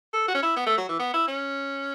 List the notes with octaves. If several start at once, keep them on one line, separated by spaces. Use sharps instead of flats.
A4
F#4
C#4
E4
B3
A3
F#3
E3
B3
E4
C#4